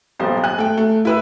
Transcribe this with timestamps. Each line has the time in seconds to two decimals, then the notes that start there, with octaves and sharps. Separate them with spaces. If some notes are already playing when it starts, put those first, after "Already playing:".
0.19 D#1 B1 C5
0.44 G#5 F#6
0.58 A3 G5
0.77 A3
1.05 E4 B4 E6